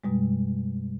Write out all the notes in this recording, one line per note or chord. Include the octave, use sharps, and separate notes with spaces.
F#2 B2 G3 G#3